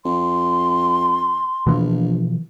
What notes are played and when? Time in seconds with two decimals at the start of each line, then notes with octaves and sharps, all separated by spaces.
0.05 F2 C6
1.66 A#1 B2 E3 F3